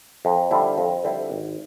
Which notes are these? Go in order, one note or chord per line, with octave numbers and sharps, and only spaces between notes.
F2
D3 G3 C4 E4
F2
D3 G3 C4 E4
G#1